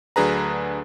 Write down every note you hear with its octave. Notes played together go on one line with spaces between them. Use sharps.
D2 F#3 D4 G#4 B4 A#5